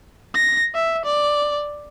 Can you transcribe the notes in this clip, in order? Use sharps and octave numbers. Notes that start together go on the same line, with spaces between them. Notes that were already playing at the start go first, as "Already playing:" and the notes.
A#6
E5
D5